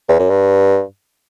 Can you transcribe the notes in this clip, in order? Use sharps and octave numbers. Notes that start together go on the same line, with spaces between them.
E2
F#2
G2